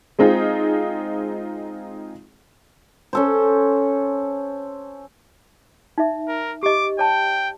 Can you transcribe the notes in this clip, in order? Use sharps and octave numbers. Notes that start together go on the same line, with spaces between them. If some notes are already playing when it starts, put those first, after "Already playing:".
G#3 C4 D#4 F4 G#4
C#4 A4 C5
D#4 E5
A#4
G4 D#5 D6
C#5 G5 A5